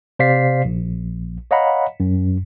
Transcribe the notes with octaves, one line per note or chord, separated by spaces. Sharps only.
C3 C5 D5 F5 B6 C7
A#1
C#5 D#5 F5 F#5 A#5 B5
F#2